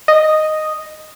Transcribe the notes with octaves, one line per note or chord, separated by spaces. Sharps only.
D#5